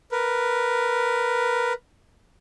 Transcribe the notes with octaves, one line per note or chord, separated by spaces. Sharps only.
A#4 B4